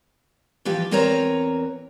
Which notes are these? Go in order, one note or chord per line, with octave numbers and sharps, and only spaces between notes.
E3 F3 G4 B4
E2 C4 A#4 B4 C#5 A#5